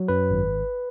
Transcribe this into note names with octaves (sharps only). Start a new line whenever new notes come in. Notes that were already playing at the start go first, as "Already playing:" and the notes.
Already playing: F#3
F#2 B4
G#1